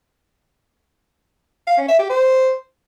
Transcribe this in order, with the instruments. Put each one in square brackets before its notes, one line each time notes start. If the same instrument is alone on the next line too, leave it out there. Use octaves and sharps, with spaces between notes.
[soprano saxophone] F5
C#4
E5
G4
C5